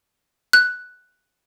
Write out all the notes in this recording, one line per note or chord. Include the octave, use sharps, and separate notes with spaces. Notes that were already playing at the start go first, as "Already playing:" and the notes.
F#6